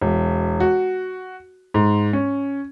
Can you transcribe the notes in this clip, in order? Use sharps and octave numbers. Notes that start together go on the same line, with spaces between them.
E1
F#4
G#2
C#4